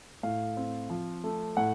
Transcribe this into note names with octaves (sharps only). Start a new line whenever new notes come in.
A2 F5
C4
F3
A3
A2 F#5